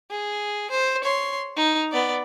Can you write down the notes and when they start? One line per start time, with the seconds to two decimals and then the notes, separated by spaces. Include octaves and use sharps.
0.11 G#4
0.70 C5
1.03 C#5 C6
1.57 D#4
1.92 B3 D5